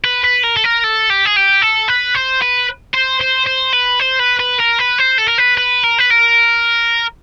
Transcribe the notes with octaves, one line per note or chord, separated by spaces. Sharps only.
B4
B4
A#4
A4
A#4
A4
G4
G#4
G4
A4
B4
C5
B4
C5
C5
C5
B4
C5
B4
B4
A#4
B4
C5
A4
A#4
B4
B4
A#4
B4
A#4